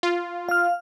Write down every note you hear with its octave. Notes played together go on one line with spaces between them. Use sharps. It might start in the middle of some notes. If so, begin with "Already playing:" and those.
F4
F5 F6